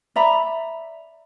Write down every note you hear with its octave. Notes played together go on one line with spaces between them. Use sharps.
D5 E5 A#5 B5